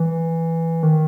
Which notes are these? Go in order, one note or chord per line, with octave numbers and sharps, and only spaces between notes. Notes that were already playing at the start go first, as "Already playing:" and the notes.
Already playing: E3
D#3